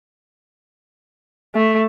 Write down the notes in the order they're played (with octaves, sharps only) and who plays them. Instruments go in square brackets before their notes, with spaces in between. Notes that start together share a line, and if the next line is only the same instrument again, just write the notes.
[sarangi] A3